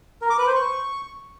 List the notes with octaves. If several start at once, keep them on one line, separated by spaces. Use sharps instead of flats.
A#4
D6
B4
C5
C#6